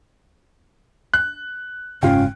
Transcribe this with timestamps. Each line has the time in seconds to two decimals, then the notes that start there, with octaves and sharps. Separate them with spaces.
1.14 F#6
2.03 F#1 G#2 C#3 C#4 F4 F5 G5